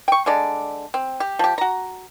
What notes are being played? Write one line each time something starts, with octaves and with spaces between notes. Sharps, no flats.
G5 C#6
D3 G#3 D5
C4
G4
F3 G4
F#4 A#5